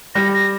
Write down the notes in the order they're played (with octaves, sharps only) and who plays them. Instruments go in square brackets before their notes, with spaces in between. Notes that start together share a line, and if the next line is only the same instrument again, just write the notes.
[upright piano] G3 [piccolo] A#6
[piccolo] A#6